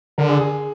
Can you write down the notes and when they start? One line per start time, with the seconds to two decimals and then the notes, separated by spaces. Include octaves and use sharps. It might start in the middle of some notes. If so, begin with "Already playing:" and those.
0.18 D3 A#4
0.29 G#4
0.40 G#4